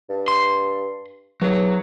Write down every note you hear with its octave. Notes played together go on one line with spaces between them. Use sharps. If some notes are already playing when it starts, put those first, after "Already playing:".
G2
C6
E2 F#3